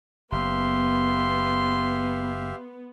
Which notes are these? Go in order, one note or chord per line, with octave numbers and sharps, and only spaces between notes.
F#1 B3 G4 E5 F5 C6